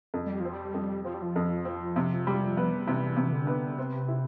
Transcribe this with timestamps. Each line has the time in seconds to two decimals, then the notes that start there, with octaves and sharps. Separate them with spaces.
0.14 F2
0.27 G3
0.40 F3
0.45 C4
0.53 G3
0.74 F2
1.05 F3 C4
1.14 G3
1.22 F3
1.36 F2
1.65 C4
1.96 C3
2.27 G3
2.57 B3
2.87 C3 E3
3.17 C3
3.25 E3
3.33 D3
3.47 B3
3.77 C3 C4
4.08 E4